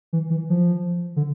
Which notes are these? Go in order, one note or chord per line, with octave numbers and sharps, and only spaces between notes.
E3
E3
F3
D3